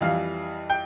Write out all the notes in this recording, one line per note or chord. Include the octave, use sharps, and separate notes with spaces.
F2 E3 G3 F5
G5